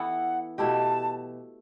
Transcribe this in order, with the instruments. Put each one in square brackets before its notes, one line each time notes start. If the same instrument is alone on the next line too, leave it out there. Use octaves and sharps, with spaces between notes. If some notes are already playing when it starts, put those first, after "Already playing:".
Already playing: [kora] E3 B3 E4 A4 [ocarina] F#5
[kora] B2 A3 E4 G4 [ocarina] A5